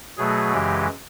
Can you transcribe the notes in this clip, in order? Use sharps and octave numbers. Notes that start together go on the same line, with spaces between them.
B2 F#3 A3 G#4
F#2 C#3 E3 G#3 G4